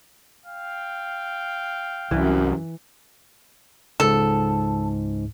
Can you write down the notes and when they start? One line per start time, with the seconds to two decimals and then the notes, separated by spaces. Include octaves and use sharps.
0.45 F5 G5
2.11 C2 F#2 E3
4.00 C#2 G#2 A4